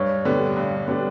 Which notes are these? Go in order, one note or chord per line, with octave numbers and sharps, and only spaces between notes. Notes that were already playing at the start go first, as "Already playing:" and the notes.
Already playing: G2 C#5
D3 G3 B3 D4
G2
D3 G3 B3 D4